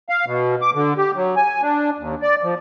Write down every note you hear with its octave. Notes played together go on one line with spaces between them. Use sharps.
F5
B2
D6
D3
G4
F#3
G#5
D4
D#2
D5
F3